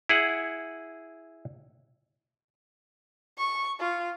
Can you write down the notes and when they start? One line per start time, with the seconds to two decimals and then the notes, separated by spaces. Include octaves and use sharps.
0.09 E4 G#4 F#5
3.38 C#6
3.80 F4